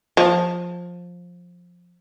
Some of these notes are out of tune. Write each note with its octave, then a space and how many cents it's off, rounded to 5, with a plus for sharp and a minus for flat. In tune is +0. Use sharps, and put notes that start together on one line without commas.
F3 +15